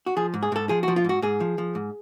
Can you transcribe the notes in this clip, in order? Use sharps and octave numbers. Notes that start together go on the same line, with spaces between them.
F#4
F3 G#4
G#2
G#4
G#2 A4
F3 G#4
F#4
F3
F4
G#2 F#4
G#2 G#4
F3
F3
G#2